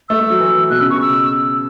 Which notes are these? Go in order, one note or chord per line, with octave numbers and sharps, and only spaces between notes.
A3 E6
A3
F#3
E3
B2 F#6
C#3 E6
B2 C#6
E6